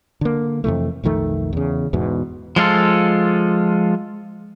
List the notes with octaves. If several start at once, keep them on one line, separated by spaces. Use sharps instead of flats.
D3 A#3
F2 C3 E3 A3
B1 F2 D#3 A3
E2 C#3
E2 G#2 B2
F3 G#3 F4 A4